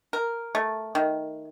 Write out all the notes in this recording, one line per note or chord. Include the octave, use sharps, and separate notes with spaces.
A#4
A3
D#3